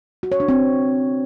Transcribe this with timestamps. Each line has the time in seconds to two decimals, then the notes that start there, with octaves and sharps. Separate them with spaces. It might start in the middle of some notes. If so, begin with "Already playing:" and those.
0.23 F#4
0.32 C#5
0.40 D4
0.48 C4